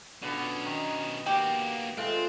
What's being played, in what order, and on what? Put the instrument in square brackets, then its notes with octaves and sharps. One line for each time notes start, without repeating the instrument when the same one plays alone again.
[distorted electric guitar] B2 C#4 [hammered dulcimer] D3 B3
[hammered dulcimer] D#3
[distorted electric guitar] A#3 F#4 [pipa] G4
[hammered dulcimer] G#3 F4 [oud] A3 [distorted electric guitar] C4